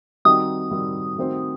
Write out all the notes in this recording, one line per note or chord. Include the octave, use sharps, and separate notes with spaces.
D#3 G3 C4 D#4 F#4 D#6
D#3 G3 C4 D#4 F#4
D#3 A3 C4 F#4 C5